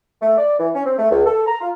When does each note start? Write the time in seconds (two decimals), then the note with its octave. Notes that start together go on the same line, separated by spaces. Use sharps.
0.21 A3
0.38 D5
0.59 E3
0.74 C#4
0.85 C4
0.98 A3
1.11 C#2
1.26 A4
1.46 A#5
1.61 F4